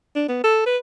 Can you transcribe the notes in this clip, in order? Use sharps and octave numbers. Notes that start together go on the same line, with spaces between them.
D4
B3
A4
B4